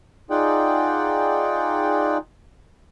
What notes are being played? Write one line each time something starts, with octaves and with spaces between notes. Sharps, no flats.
D#4 F4 G#4 D5 F#5 G5